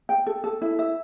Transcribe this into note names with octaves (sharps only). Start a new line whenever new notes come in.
G5
A4
A4
E4
E5